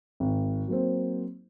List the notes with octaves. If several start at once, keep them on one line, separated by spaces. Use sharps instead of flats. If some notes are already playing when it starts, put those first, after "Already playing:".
G#1
F#3 A#3 C4